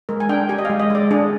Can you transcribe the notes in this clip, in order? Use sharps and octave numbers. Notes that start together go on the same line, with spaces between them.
G#3 A#4
G#5
D4 G5
G4 G#5
D#5
G#3 F5
D#5
G#3 D5
D4 G#4